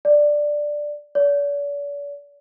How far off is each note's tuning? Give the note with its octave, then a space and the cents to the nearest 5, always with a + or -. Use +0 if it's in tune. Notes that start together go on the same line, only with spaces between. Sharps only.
D5 +5
D5 -45